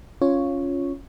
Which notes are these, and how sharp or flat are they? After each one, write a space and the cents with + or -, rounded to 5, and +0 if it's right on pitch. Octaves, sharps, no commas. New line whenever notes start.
C#4 +0 F4 +0 C#5 +0